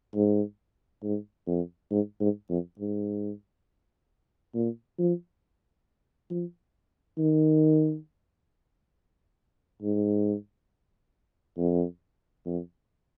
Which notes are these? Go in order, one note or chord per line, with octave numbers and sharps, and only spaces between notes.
G#2
G#2
F2
G#2
G#2
F2
G#2
A#2
F3
F3
D#3
G#2
F2
F2